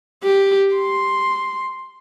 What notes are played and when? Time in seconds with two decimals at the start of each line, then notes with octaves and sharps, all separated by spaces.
0.23 G4
0.75 C6